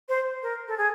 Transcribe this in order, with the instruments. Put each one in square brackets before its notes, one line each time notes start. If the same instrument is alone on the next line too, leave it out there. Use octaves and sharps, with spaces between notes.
[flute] C5
A#4
A4
G#4